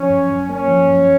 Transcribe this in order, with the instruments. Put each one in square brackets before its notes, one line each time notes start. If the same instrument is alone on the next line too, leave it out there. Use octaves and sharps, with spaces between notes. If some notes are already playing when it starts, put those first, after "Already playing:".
Already playing: [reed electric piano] F3 [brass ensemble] C#4
[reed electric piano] F#2
F#2
[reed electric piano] A#3 [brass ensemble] C#4
[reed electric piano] F3
F#2